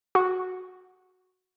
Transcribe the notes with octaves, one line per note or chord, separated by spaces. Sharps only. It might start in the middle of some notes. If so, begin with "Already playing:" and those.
F#4